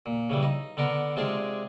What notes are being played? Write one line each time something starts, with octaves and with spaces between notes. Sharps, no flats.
A#2
C#3 E3 G3
D#4
D3 B3 D4 A#4
C3 G#3 D4 F4 G#4